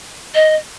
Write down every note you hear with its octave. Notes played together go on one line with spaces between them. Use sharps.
D#5